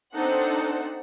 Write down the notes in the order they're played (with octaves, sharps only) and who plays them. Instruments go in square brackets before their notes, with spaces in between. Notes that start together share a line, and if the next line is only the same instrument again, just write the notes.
[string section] C4 D4 D#4 A4 C5 F#5